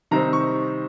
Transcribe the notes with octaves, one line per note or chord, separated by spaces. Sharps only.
C3 D#3 G3 C4 D#4 A#5
C#6